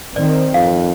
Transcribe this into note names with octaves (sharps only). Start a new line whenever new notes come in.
D#3 C4 D5
F2 F5